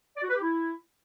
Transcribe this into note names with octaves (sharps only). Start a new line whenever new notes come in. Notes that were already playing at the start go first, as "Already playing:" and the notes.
D5
F#4
B4
G4
E4